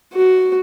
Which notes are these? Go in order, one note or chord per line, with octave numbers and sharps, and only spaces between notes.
F#4